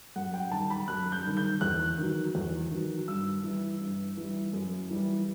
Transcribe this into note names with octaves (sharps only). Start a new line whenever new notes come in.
F#2 F#5
G5
D#3 G3 A5
B5
F#2 F#6
G6
D#3 G3
G6
E2 F#6
D#3 F#3
E2
D#3 F#3
G2 E6
E3 G3
G2
E3 G3
F#2
E3 G3